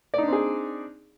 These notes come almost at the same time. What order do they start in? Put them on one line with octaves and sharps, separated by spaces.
D5 D#4 D4 C4 G#4